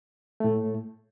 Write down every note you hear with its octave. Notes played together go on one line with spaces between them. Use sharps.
A2 A3